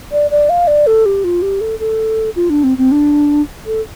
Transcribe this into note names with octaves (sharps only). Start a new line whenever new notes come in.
D5
D5
F5
D5
A4
G4
F4
G4
A4
A4
F4
D4
C4
C4
D4
A4